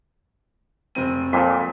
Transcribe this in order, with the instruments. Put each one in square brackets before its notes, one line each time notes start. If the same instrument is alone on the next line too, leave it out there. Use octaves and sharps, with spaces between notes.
[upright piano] F1 C4 D#7
[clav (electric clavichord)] F2 A#2 [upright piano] F3 C6 B6